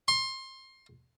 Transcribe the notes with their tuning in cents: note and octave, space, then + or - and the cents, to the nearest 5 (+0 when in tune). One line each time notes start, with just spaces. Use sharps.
C6 +25